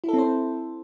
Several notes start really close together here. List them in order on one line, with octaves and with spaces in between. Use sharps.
E4 A4 C4 C5